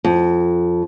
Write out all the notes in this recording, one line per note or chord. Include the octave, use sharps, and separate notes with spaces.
F2